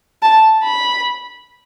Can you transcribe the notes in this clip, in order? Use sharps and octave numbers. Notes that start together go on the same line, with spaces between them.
A5
B5